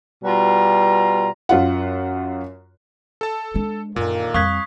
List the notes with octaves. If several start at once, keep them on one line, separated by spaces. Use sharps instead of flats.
B2 G3 F4 A#5
F#2 F4 F#5
A4 A5
G#3 D4
F#2 A#2 D3 D#3 A#3
F2 G3 F5 C#6 D#6 F#6 G#6 B6